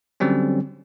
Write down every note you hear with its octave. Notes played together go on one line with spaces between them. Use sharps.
D3 F#3 G3 C4 C#4